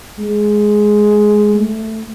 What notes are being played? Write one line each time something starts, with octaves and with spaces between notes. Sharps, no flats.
G#3
A3